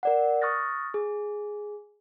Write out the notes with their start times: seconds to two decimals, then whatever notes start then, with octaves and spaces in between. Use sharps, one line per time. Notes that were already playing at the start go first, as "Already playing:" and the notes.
0.03 A#4 D5 F#5
0.42 C#6 D#6 F6 F#6 A6 A#6
0.94 G#4